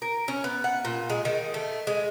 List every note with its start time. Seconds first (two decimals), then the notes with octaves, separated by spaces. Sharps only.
0.02 A#4
0.28 C#4
0.44 B3
0.64 F#5
0.85 A#2
1.10 G#3
1.25 D#3
1.54 A3
1.87 G#3